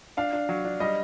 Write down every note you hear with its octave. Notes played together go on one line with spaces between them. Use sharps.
D4 F5
D4
F#3
D4
G3 D#5